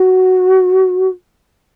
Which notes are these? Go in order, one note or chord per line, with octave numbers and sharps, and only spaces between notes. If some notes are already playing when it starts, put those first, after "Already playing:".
Already playing: F#4